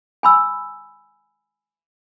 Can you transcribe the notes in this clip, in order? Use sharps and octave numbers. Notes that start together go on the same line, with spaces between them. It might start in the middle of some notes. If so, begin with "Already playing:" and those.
G#5 B5 E6